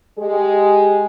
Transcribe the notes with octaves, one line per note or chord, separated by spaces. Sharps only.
G#3 G4 G#4